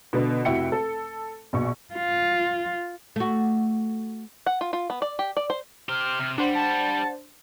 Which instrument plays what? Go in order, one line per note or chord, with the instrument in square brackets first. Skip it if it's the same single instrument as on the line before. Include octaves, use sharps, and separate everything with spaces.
[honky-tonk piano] B2 D3 B3
F1 E4 F#4 E5 G5 C#7
A4
A#1 B2 C#6
[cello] F4
[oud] A3 F#4
[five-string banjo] F#5
F4
F4
B3
D5
G4
D5
C5
[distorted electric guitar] G4 C5 [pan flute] F6
[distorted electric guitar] C3
[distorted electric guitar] G3 [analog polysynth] D4 C5 [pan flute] F#5
[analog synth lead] A5